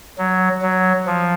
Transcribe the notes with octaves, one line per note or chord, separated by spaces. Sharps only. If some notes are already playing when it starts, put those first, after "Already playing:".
F#3
F#3
F3